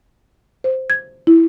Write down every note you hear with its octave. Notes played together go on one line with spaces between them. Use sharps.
C5
G#6
E4